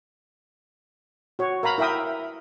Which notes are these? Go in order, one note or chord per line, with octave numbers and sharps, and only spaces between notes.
F#4 C#5
A#4 F5 A#5 B5
E4 A#4 E5 G5 D#6